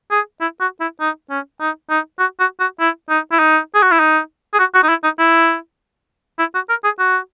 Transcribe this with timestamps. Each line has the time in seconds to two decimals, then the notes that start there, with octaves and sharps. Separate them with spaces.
0.11 G#4
0.41 E4
0.61 F#4
0.80 E4
1.00 D#4
1.30 C#4
1.60 D#4
1.90 D#4
2.19 F#4
2.40 F#4
2.60 F#4
2.80 E4
3.10 D#4
3.32 E4
3.39 D#4
3.75 G#4
3.82 F#4
3.91 E4
4.00 D#4
4.54 G#4
4.59 F#4
4.74 F#4
4.83 D#4
4.89 E4
5.04 D#4
5.19 E4
6.39 E4
6.54 F#4
6.69 A#4
6.84 G#4
6.99 F#4